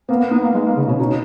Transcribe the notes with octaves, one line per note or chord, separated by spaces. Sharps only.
A#3 B3
A#3
B3 D#4
A#3
G#3
A#3
C#3
B2 C#4
B2 D#4